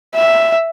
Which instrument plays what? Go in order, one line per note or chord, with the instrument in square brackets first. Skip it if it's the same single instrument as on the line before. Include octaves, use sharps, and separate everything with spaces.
[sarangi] E5